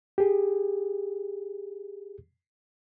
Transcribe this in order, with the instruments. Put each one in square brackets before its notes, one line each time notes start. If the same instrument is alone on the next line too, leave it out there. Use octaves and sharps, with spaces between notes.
[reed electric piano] G4 G#4